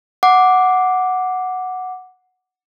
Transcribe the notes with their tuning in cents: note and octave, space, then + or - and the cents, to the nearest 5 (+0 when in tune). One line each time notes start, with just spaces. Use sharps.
F#5 +0 D6 +0